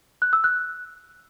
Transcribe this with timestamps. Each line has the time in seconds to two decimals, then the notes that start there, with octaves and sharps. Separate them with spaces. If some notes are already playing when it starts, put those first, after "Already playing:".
0.22 F#6
0.33 E6
0.44 F#6